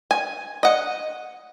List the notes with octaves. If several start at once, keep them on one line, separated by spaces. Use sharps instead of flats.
G#5
D#5 F#5